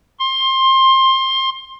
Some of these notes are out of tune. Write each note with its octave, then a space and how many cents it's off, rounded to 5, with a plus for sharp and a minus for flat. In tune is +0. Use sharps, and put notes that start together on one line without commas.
C6 +20